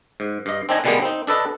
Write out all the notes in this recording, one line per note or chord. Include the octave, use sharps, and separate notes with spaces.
G#2
G2 D#5
C4 D4 D#4 D#5 G#5 A#5
B2 D3 G3 G#3 A#3 B3
C4 D#4
D4 A4 B4 D#5